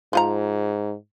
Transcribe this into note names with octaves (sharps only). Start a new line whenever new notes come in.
G#2 F3 F4 A#5